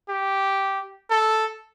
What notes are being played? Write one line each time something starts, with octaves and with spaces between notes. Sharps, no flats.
G4
A4